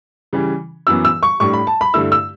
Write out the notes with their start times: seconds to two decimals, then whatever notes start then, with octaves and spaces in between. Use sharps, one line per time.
0.33 C#3 E3 G3
0.87 F#2 E3 B3 E6
1.05 E6
1.23 C#6
1.40 A2 G3 D4 C#6
1.53 B5
1.67 A5
1.81 B5
1.94 G2 D3 A3 E4 E6
2.12 E6